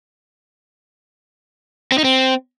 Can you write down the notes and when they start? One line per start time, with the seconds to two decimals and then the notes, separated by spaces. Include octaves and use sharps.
1.92 C4
1.98 D#4
2.04 C4